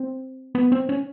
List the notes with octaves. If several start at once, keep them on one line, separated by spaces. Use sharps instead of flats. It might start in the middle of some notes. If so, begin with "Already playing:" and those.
Already playing: C4
B3
C4
C#4